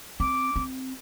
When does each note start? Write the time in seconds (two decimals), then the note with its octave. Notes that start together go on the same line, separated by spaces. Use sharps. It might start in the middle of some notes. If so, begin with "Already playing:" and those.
0.20 C4 D6
0.56 C4